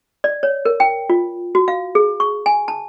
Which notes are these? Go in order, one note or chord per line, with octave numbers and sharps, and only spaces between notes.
D5
C#5
A#4
G5
F4
F#4
F5
G#4
C#6
G#5
A5